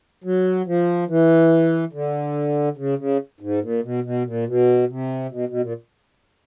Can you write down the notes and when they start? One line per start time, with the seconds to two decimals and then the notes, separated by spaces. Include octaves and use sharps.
0.24 F#3
0.66 F3
1.09 E3
1.93 D3
2.77 C#3
2.99 C#3
3.41 G#2
3.62 A#2
3.83 B2
4.04 B2
4.25 A#2
4.47 B2
4.89 C3
5.31 B2
5.49 B2
5.61 A#2